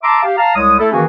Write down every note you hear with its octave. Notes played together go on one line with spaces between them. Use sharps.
E5 A5 A#5 C6 D6
G4 F5
F5 A5 A#5
C2 G#3 C#5 D#6
A3 E4 A4
D#3 E3 A#3 C#4 F#4 G#4